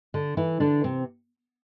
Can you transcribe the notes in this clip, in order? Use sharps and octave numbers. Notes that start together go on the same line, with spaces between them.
D3 D4
E3 E4
D3 D4
C3 C4